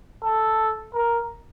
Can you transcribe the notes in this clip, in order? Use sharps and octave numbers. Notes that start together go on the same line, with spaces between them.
A4
A#4